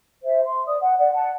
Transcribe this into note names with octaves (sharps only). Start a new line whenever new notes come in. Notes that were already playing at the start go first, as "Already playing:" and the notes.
C5 E5
C6
D5 D#6
F#5
D5 F#5
F#5 A5